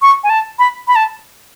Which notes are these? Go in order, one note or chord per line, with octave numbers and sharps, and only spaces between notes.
C#6
G#5
A5
B5
B5
A5